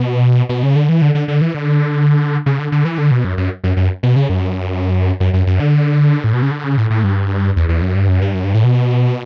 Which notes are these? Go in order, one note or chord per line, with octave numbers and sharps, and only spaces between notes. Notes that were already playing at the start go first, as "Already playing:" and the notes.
Already playing: B2
B2
C#3
D3
E3
D3
D3
D3
E3
D3
C#3
D3
D3
E3
D3
B2
F#2
F#2
F#2
F#2
B2
C#3
F#2
F#2
F#2
F#2
D3
A2
B2
C#3
D3
C#3
A2
A2
G2
E2
E2
F#2
G2
F#2
G2
F#2
G2
A2
B2